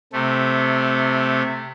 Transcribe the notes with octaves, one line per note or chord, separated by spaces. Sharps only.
C3 A3